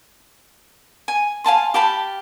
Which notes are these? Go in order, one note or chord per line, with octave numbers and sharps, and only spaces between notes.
G#5
F5 G#5 A5 C6
G4 F5 A5 B5